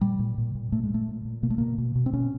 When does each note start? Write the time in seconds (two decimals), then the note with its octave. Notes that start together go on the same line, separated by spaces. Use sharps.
0.01 A#2 G3
0.19 A#2
0.38 A#2
0.55 A#2
0.72 A#2 A3
0.83 G#3
0.90 A#2 A3
1.08 A#2
1.25 A#2
1.43 B2 A#3
1.50 A3
1.58 B2 A#3
1.78 B2
1.95 B2
2.06 C4
2.13 B2 C#4